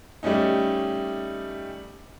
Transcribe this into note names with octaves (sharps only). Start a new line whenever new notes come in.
G3 A3 C#4 D#4